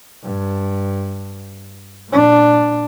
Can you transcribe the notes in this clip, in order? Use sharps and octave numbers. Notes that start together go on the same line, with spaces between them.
G2
A#2 D4